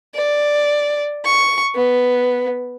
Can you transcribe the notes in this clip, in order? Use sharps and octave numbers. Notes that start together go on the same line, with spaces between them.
D5
C#6
B3